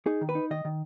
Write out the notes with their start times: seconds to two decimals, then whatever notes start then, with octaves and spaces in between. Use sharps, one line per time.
0.06 D#4 G#4
0.21 D#3
0.29 B4
0.35 D#4
0.50 D#3 D#5
0.65 D#3